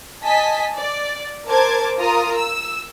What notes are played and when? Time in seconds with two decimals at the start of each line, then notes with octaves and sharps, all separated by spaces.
0.24 D#5 G#5 A5 B6
0.78 D5
1.48 A#4 C5 A5 D6 G#6
1.99 F4 A#4 A#5 D#6
2.36 E6